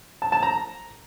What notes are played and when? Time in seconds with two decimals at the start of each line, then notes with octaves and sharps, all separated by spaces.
0.22 A5
0.32 A5
0.43 A#5